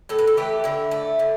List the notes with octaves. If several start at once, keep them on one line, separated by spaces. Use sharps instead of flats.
A2 A4
B4
A4
E3 A3 G4
D3 E4
A3
D3